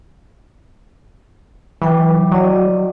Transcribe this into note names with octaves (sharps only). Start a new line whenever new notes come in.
E3 F#3 G5 D6
F#3 D5 D#5